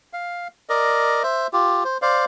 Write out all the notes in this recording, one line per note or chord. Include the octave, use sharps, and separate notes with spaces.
F5
A#4 D5 D#5
C5 E5
F4 G4
C5
C5 D5 F5